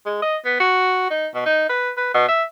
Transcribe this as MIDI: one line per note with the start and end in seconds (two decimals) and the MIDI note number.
0.06 0.18 56
0.22 0.37 75
0.45 0.59 59
0.60 1.08 66
1.10 1.27 63
1.35 1.45 47
1.46 1.68 63
1.70 1.91 71
1.97 2.14 71
2.14 2.26 47
2.29 2.43 76